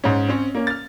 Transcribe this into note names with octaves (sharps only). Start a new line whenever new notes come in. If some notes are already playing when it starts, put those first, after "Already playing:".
G#2 C#4
C4 C#4 C#5
A#3 C#4
F6 A6